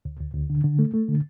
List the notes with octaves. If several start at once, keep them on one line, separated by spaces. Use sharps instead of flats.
D2
D2
D2
D3
D3
A3
A3
D3